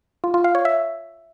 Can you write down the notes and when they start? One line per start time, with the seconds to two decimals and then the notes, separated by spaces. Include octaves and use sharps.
0.24 F4
0.34 F4
0.44 F5
0.55 C#5
0.65 E5